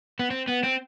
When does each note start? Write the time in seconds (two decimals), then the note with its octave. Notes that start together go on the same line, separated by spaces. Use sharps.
0.19 B3
0.30 C4
0.47 B3
0.63 C4